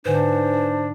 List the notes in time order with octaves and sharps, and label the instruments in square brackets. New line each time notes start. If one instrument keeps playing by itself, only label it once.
[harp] G#2 D3 F#5 [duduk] D4 [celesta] B4 G#5 [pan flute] C5